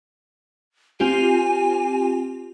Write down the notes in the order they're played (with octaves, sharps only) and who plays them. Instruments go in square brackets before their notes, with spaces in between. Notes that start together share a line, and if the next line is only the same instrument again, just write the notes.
[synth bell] C4 F4 G4 [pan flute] G#5